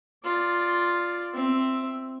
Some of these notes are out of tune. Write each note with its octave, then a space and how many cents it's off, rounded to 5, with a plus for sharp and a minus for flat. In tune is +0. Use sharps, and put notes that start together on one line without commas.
F4 +0 D5 +0
C4 +0 E5 +0